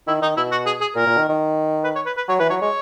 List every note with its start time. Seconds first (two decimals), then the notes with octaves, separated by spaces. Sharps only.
0.07 D#3 E4
0.22 D#3 D#4
0.37 B2 E4
0.52 F#4
0.66 G#4
0.81 G#4
0.96 A#2 A#4
1.07 A#2
1.18 D#3
1.29 D#3
1.84 B4
1.96 C#5
2.06 B4
2.17 B4
2.29 F#3 C#5
2.40 E3 B4
2.50 F#3 C#5
2.61 G#3 C#5